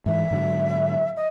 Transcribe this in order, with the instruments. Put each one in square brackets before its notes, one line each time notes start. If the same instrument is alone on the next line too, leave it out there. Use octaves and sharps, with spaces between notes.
[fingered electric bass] G#2 E3 [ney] E5
[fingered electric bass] G#2 D3 F#3
[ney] D#5